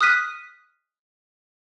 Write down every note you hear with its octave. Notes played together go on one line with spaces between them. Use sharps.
D#6 F6 F#6 B6 D#7